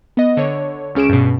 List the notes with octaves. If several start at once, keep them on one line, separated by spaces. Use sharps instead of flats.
B3 D#5
D3 C#5
C#2 C#4 G#4 D7 E7
G2 B2